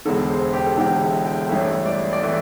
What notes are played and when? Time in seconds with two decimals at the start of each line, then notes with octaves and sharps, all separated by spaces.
0.05 E1 E2 D3 A4
0.30 C5
0.53 G4
0.66 A4
0.77 E1 E2 D3 G4
1.01 E4
1.25 G5
1.49 A1 G2 E3 A3 E5
1.86 D5
2.13 D5
2.21 E3 A3 E5